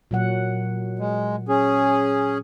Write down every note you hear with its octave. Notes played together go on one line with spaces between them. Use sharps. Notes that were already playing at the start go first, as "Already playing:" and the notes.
A#2 F#3 F#5
G#3
C#4 G#4